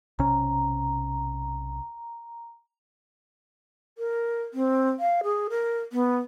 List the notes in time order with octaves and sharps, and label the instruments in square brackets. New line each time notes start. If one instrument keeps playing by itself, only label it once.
[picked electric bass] B1 C3 C#4 [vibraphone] A#5
[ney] A#4
C4
F5
G#4
A#4
B3